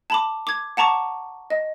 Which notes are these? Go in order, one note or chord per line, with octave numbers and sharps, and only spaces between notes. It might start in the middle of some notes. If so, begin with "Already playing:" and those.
A5 B5 D6
D6 G#6
F#5 A5 A#5 C#6 D6
D#5